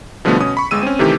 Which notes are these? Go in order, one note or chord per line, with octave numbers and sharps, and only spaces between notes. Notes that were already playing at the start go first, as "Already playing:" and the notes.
B2 D3 F3 G3 A3 B3
B2 C#4 D#6
B5 C#6
G1 G#3 E6 D#7
C4 C#4
C3 D#3 E3 A3 G4